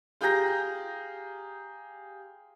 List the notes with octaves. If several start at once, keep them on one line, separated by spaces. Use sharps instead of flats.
F4 G4 G#4 A#5 G6 A#6